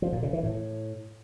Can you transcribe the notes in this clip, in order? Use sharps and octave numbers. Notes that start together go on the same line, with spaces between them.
F3
A#2
C#3
E3
A2